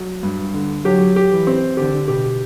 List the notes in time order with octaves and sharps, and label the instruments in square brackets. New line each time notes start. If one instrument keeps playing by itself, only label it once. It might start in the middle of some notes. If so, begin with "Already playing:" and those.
Already playing: [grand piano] F#3
G2
D3
[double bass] F#3 [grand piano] G4
[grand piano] G4
[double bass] E3
[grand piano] C4
[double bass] D3 [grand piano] G4
[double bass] B2 [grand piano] G4